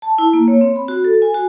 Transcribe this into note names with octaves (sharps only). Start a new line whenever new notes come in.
A5
E4
A#3
C#5
C4
B5
F#4
A4
G#5
F#4